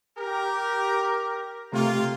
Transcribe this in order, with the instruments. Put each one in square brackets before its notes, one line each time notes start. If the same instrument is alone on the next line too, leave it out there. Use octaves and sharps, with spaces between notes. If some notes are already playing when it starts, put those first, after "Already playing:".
[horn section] G4 A#4
[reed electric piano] C3 A3 G4 [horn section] A#3 F4